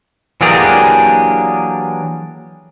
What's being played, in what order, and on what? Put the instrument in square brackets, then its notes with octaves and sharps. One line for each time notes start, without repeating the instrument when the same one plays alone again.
[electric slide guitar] E3 F#3 A#3 D4 G4 G#4